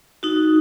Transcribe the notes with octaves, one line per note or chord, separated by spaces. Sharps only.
D#4 F#4